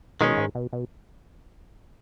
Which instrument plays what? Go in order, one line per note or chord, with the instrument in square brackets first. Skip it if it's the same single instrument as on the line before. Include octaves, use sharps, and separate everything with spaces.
[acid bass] B2 [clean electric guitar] D#3 G#3 C#4
[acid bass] G#2
B2
B2